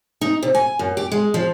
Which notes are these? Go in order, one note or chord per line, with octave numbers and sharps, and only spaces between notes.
D#4
C3
G#5
F#2
G4
G#3
F3